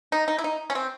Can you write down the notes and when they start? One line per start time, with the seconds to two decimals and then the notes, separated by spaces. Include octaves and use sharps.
0.12 D#4
0.28 D#4
0.38 E4
0.44 D#4
0.70 C#4
0.75 C4